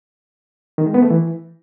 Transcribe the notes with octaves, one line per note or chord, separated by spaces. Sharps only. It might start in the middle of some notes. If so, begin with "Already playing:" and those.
D#3
G#3
B3
A3
E3